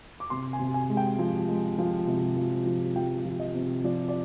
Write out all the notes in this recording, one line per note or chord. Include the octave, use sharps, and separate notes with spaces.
D6
C3 C6
G#5
C3
G#5
G#3
G5
F3
G#3
F3
C3
F3
F3
F3 G5
F3
D#5
C3
F3 D5
D5